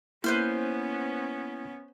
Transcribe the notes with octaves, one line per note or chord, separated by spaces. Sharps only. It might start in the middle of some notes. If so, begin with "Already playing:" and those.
A#3 B3 C#4 E4 B4 C5 F6